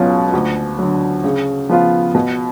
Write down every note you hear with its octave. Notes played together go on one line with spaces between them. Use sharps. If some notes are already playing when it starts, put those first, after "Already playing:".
Already playing: C#2 B2 F#3 C#4 F4
D2
D3 F#3
C#3
F3 B3 F4
B2